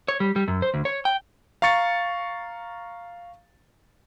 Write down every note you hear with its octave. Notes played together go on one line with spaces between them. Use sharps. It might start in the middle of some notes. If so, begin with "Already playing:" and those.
C#5
G3
G3
F#2
C5
D2
C#5
G5
F5 A#5 C#6 A6 C#7